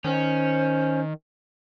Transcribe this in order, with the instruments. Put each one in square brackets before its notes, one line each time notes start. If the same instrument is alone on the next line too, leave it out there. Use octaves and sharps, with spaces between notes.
[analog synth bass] D#3 [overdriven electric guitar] C#4 [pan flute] C5